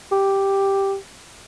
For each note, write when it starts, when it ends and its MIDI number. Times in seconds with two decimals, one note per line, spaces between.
0.12 0.96 67